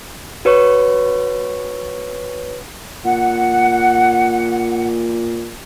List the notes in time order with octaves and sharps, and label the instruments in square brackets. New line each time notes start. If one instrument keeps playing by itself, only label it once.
[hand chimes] F#4 B4 C#5 C#6
[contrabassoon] A#2 [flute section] F#5